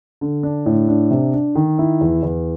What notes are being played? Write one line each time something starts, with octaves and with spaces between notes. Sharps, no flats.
D3
D4
A2
D4
C3
D4
D#3
E4
E2
E2